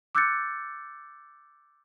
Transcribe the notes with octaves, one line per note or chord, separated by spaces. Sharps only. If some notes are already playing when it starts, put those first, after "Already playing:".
D6 E6 F#6 G6 A6 C#7